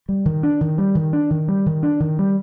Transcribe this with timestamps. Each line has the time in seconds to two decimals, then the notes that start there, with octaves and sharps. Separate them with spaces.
0.09 G3
0.25 D#3
0.43 D4
0.61 D#3
0.78 G3
0.95 D#3
1.13 D4
1.30 D#3
1.48 G3
1.66 D#3
1.83 D4
2.00 D#3
2.19 G3